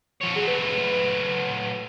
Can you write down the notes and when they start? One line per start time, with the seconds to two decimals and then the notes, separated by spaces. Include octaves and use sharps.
0.21 F3 C#5
0.35 F#3 A3 G#4
0.48 B4